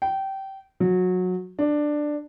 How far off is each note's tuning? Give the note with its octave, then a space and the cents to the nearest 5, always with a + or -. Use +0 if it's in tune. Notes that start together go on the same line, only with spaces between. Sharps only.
G5 -20
F#3 -20
D4 +10